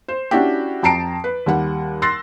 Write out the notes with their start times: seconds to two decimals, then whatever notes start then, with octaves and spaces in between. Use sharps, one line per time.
0.08 C5
0.31 C#4 D4 E4 F#4 G4
0.83 F2 G5 A5 A#5 C7 D7
1.24 B4
1.46 D#2 G3 F#5
2.02 C6 E6 F#6 A6 A#6 C7